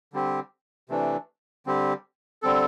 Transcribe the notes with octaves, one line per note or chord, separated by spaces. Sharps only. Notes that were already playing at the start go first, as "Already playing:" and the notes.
D3 G3 C4 G4
C3 E3 A3 D4
D3 G3 C4 G4
D3 G3 C4 A4